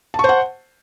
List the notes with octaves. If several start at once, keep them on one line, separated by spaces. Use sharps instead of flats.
C5 F#5 A5 C#6